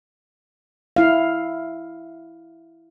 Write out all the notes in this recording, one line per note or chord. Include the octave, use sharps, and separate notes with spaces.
E4 F5